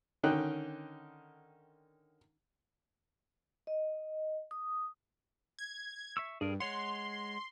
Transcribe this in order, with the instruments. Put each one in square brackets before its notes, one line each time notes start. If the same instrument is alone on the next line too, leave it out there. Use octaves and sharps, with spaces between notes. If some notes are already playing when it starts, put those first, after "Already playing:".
[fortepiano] D3 D#3 C#4 D#4 G5 F#6
[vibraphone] D#5
D#6
[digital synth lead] G#6
[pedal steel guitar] E5 C#6 E6
[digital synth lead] G2 [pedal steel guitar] G#4 A#4
[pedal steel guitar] G#3 C#5 F#5 [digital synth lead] C6